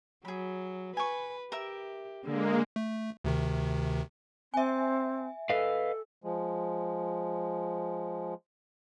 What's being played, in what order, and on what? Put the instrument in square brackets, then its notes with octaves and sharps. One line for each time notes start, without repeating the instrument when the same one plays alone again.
[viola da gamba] F#3 [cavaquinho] G#4 B5
[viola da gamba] B4 [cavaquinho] G#5 C#6
[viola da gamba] G4 [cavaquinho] A#4 E5
[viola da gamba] D3 [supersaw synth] G#3 A#3
[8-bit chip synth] A3
D2 C3 D#3
[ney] C4 [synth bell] E5 G#5
[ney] A4 [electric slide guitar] B4 D#5 F5
[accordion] F3 G#3